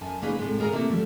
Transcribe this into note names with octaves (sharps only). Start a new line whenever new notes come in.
F#2 F3 G#5 A5
C#3 A#3 C#4 D#4 G#4 B4
A2 C3 F#3 G#3
D#2 G#4 A#4 C#5 A#5
C3 A3 A#3 E4
D#3 F3 G3 A3